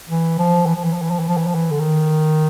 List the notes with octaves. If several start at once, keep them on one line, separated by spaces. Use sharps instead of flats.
E3
F3
E3
F3
E3
F3
E3
F3
E3
F3
E3
F3
E3
D3
D#3